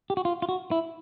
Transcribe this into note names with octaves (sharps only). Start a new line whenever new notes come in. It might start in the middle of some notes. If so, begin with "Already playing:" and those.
G4
F#4
F4
F4
F#4
E4